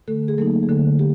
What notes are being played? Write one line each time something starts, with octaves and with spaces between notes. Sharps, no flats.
D3 A3 A4
G#4
F#3 A3 A#3 D#4 A4
G#4
D3 A3 A4
G4